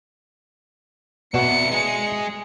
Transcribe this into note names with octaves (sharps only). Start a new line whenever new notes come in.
B2 D4 E4 F#4 C#7
G#3 G#4